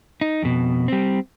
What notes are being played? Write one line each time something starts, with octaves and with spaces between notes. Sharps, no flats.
D#4
F2 B2
G3 C4